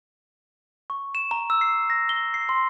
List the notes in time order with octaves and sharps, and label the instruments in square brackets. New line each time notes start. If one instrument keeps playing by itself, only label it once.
[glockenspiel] C#6
E7
A#5
E6
C7
A#6
G7
C7
C6